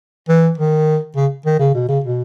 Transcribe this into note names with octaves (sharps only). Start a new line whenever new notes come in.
E3
D#3
C#3
D#3
C#3
B2
C#3
B2